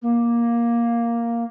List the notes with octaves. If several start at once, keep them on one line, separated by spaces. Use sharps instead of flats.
A#3